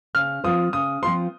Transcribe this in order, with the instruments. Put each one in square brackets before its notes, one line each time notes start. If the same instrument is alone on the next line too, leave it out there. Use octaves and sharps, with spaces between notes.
[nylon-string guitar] C#3 [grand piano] F6
[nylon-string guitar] F3 C4 F4 C5 [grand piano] D#6
[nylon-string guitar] C#3 [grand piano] D#6
[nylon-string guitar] F3 C4 F4 C5 [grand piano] C6